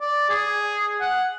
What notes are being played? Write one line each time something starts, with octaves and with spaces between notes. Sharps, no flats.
D5
G#4
F#5